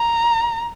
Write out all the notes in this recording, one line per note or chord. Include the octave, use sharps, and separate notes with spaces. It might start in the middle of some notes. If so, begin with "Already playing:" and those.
Already playing: A#5